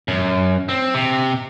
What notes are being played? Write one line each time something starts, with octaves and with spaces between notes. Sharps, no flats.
F#2
C4
C3